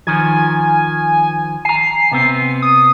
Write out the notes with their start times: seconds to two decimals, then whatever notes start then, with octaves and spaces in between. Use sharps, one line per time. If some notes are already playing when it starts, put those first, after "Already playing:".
0.07 D#3 F3 G#5
1.65 G#5 A#5 C7
2.12 C3 B3 C4
2.62 D#6